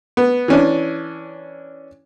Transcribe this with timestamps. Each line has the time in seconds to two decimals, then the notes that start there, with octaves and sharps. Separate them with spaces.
0.17 B3
0.48 E3 C#4 D4